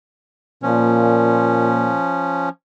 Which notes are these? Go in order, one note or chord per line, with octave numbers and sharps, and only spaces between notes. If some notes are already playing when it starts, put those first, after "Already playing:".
A#2 F3 C#4